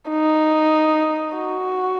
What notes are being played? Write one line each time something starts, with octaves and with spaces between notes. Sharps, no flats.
D#4
F#4